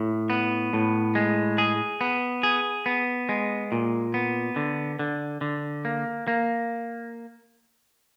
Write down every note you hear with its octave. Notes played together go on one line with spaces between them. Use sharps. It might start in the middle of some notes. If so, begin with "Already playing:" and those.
Already playing: A2
B3
A2
G#3
G#4
B3
G#4
B3
G#3
A#2
B3
D3
D3
D3
A#3
A#3